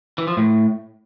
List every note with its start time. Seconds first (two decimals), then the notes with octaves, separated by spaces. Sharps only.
0.18 E3
0.27 F3
0.37 A2